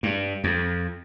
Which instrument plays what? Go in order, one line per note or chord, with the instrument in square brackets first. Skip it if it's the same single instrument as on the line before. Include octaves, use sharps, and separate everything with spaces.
[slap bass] G2
F2